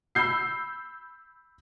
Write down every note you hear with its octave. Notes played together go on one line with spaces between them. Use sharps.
B5 E6 G6 C7